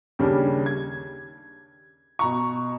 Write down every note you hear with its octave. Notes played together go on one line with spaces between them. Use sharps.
D#2 C#3 G3 C#4 D4
G#6
B2 A#5 C#6